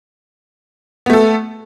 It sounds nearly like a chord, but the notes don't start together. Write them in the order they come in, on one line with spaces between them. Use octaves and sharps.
B3 A3 A4